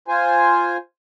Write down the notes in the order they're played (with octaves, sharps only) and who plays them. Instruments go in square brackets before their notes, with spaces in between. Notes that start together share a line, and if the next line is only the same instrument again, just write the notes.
[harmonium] F4 C5 G#5